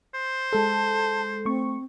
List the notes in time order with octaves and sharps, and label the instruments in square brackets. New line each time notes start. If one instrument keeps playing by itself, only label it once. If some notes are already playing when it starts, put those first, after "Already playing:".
[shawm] C5
[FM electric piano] G#3 A4 [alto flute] A5
[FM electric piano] A3 C#6 [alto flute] C4